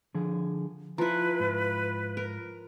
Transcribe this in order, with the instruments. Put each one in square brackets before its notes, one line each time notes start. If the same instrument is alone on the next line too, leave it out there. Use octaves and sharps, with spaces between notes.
[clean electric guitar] D3 F3 G#4
[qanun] F3 E4 [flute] B4 [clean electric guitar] A#5
[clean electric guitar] G#2 F4
[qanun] A#4